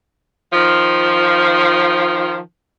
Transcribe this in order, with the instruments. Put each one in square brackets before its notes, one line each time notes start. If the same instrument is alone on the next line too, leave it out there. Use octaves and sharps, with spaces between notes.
[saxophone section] D#3 F3